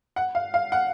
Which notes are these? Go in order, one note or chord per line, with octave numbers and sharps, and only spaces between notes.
F#5
F5
F5
F#5